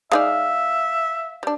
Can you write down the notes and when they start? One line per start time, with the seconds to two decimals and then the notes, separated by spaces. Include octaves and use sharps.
0.12 G#3 D#4 D5 E5 F5
1.43 G3 D4